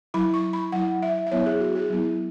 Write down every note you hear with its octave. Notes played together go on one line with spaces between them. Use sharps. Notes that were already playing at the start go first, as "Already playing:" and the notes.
F#3 E4 B5
C#6
B5
F#3 E4 F#5
E5
E5
F#3 B3 E4 C#5
G#4
F#4
G#4
F#3 B3 E4